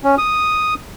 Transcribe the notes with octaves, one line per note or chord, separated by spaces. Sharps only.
C#4
D#6